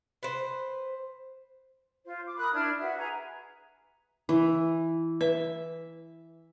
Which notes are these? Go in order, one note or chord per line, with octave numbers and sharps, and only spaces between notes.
B4 C5
F4 C5
D6
A#4 B5 D#6 F#6
D4 E4 F6 G#6
F#4 B4 E5
G#4 B4 G#5 A#5
E3
B4 E5